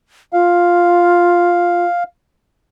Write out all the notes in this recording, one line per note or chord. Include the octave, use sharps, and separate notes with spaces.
F4 F5